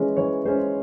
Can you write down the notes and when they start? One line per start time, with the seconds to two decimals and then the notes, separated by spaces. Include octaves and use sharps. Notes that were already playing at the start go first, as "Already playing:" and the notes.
Already playing: E3 G#3 C#4
0.17 E3 C#5
0.45 G#3 C#4 C5